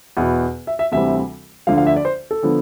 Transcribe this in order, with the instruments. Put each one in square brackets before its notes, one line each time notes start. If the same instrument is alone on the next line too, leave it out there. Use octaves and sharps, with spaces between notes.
[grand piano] E2 B2 B3
E5
E5
D2 C3 E3 G3 C4 E5
D2 D3 F3 F5
F5
E5
D5
C5
A4
D3 F3 B3